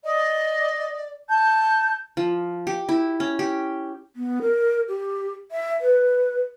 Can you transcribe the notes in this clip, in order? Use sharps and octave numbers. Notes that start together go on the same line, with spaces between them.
D5 D#5
A5 G6
F3
G4
E4
C#4
G4
B3
A#4
G4
E5
B4